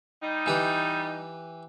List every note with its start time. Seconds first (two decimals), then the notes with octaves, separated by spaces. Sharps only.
0.23 G3 D#4
0.46 E3 G4 B4